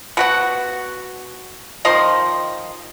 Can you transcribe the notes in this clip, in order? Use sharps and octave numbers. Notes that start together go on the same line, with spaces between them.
B2 F#4 F#5
D#3 F3 D#5 C6